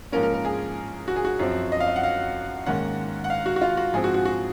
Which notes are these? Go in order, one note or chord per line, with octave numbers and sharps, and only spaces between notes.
G#2 F3 A#3 C#4 A#4
A#4
A#4
G#4
F#4
G#4
F#4
F#2 F3 C4
D#5
F5
D#5
F#5
F5
G#2 D#3 A#3 C#4 F#5
F#5
F5
F#4
F#4
F4
F#4
G#2 F3 C4 G#4
F#4
F#4
F#4